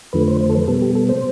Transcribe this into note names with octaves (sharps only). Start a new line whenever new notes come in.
F2 D3 F3 A3 B4
C5
C5
A4
B4
B2 G3 B3 A4
G4
A4
C5